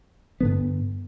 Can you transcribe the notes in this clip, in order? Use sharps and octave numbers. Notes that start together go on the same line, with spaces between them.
G2 D3 B3